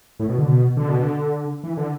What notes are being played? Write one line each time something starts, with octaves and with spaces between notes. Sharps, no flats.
A2
B2
D3
B2
D3
B2
D3
E3
D3